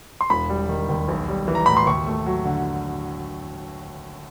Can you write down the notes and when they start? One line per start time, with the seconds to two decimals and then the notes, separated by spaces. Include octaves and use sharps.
0.21 C6
0.30 E1 B5
0.50 G3
0.69 D#3
0.89 D#2
1.08 B1
1.29 G3
1.48 E3
1.55 A#5
1.66 A2 B5
1.77 C6
1.87 D#2 C#6
2.06 A3
2.26 F#3
2.45 D3